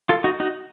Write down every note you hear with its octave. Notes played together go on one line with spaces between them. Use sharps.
F4 A4
D#4 F#4
D#4 F#4